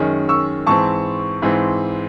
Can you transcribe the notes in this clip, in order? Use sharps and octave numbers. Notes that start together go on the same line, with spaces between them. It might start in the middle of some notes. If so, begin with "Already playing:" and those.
Already playing: F#2 D#3 G#3 C#4
C#6 E6
G#2 E3 C4 A5 C#6
G#2 E3 C4